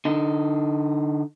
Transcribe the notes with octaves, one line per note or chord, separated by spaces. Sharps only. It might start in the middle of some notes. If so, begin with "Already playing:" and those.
D3 D#4